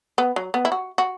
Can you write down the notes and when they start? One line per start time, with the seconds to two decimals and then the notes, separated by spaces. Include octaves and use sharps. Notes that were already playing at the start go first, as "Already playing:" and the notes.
0.18 B3
0.36 F#3
0.54 B3
0.65 E4
0.72 F#4
0.98 F#4